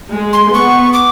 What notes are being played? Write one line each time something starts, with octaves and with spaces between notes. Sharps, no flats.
G#3
C6
B3 C#6
D6